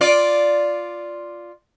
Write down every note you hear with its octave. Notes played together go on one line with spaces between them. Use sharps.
F4 D5